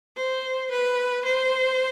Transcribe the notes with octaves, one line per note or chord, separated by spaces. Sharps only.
C5
B4
C5